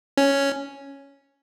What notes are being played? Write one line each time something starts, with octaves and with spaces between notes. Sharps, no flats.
C#4